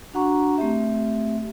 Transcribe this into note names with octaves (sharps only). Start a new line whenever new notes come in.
D4 F#4 F#5 A#5 C#6
A3 C4 G4 E5